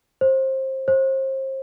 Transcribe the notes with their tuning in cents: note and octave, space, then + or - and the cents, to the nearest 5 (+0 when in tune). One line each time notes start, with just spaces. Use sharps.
C5 +25
C5 +35